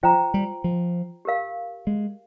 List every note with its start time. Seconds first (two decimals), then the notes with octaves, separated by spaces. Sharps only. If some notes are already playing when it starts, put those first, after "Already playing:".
0.03 F3 F4 C5 G5 A#5
0.34 G3
0.64 F3
1.25 G4 A#4 F5
1.87 G#3